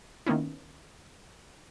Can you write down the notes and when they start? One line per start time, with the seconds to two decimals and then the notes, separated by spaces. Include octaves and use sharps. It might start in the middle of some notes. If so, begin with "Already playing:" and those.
0.26 D#3 A#3 B3 C#4 E4